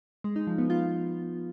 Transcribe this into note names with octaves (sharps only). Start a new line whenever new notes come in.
G#3
D#4
F3
B3
F4